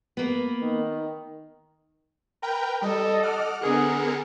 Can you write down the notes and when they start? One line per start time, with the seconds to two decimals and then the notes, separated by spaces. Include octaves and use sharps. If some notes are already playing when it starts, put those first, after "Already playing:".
0.17 A#3 B3
0.62 D#3
2.42 A#4 B4 G5
2.82 G3 A4 D#5
3.23 F#5 D6 F6
3.61 D3 B3 G#4 A#4 C#7